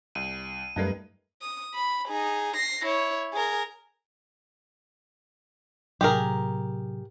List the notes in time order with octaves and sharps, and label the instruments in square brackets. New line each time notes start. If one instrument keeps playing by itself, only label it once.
[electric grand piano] C2 [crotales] D#7
[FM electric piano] F#2 G3 A3 [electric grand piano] D#4 A#4 B4
[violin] D#6
B5
D#4 G#4
A#6 C7
E4 C#5
G#4 A#4
[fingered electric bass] A2 C3 F#3 [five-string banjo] G4 G#4 A#4